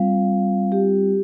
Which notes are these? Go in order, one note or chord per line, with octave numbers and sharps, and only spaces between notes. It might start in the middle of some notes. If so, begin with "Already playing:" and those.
Already playing: G3 C4 F4 F5
G4